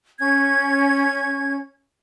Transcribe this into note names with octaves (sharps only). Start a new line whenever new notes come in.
C#4 G#6